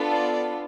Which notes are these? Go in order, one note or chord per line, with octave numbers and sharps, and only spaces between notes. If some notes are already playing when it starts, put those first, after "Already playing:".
Already playing: B3 D4 F4 A4
D5